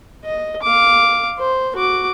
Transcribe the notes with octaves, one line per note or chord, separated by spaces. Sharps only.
D#5
F5 D6
C5
F#4 D6